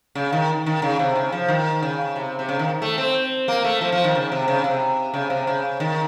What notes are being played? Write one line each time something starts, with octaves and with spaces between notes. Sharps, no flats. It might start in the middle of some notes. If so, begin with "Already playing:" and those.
C#3
D#3
D#3
C#3
C3
C#3
F3
D#3
C#3
C3
C3
C#3
D#3
A3
C4
A#3
A3
F3
F3
D#3
C#3
C3
C#3
C3
C#3
C3
C#3
D#3